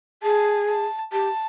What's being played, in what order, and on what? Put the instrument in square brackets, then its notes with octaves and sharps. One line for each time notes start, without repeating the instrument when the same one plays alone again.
[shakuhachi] G#4 [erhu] A5
[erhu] A5
[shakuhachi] G4 [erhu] A5